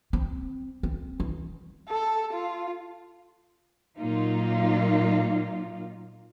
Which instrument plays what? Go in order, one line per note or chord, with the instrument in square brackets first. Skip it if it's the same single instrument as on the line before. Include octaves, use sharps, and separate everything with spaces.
[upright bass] C4
C4
E3
[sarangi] A4
F4
[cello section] A#2 F#3 A#3 D#4 F4